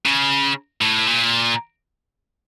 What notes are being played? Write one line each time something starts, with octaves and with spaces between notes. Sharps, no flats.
C#3
A2
A#2